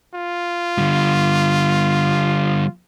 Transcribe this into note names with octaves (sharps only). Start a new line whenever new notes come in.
F4
D3 G3